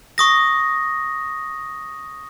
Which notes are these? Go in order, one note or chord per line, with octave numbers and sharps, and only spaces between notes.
C#6 D#6 A#6